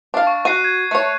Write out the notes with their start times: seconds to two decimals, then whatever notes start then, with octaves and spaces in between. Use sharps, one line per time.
0.14 D4 F5
0.27 C#6
0.45 F#4 F#6 C7 D#7
0.64 G#6
0.91 A3 C#5